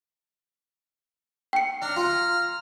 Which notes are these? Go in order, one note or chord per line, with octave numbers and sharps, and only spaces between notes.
G5 C#7
D4 A#5 F6
F4